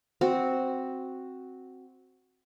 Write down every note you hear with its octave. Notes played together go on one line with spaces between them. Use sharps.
C4 F#4